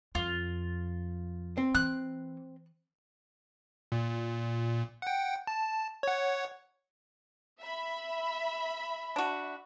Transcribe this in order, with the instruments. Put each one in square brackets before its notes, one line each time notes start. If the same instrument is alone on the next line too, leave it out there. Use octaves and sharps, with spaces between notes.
[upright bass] F2 [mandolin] F4
[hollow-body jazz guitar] C4
[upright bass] E3 [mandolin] F#6
[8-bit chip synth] A#2
F#5 G5
A5
C#5 F#5
[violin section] E5 B5
[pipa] D4 F#4